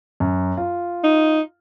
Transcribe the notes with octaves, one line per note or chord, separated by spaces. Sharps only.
F#2
F4
D#4